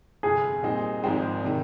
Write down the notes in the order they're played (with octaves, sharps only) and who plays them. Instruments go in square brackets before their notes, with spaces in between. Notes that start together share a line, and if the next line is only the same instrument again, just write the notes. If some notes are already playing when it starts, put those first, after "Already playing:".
[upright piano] G1 F2 C3 [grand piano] G#4
[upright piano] A#2 G3 C4 D#4
G#1 G#2 F3 G#3 C4
C3 D#3